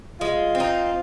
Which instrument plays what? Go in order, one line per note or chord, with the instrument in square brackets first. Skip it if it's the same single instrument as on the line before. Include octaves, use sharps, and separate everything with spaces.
[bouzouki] G#3 [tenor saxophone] F4
[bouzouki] C4
D#4